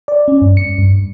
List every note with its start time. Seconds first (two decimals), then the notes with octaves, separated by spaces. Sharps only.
0.08 D5
0.28 C#4
0.42 G2
0.57 C#7
0.78 G2